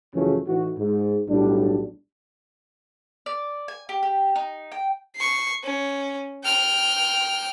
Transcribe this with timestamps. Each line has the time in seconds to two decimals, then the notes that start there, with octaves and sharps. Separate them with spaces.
0.14 F#2 C#3 E3 F3 A3 C#4
0.47 A2 E3 D#4 F#4
0.77 G#2
1.29 B1 A2 G3 D4
3.26 D5
3.68 G#5
3.89 G4
4.03 G4
4.36 D#4
4.72 G5
5.16 C#6 C7
5.64 C#4
6.44 G5 F6